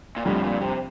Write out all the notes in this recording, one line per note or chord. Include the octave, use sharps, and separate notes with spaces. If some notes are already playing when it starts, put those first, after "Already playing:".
A#2
F2 A2 D3 G3
A#2
C3